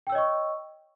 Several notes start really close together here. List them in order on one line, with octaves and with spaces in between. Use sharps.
G5 E6 C#5 D#5 C#6